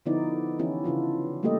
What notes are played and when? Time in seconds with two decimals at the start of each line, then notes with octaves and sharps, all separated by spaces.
0.06 D3 F3 B3 D#4 E4 D5
0.59 E3 B3 C#4 E4 G4
0.84 C#3 E3 D4 F4
1.43 G3 A3 A#3 G4 A4 D#5